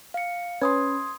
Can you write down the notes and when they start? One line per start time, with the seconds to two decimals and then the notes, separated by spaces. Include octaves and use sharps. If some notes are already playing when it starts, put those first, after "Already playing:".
0.14 F5 C#7
0.61 C#4 B4 C6 D#6 G#6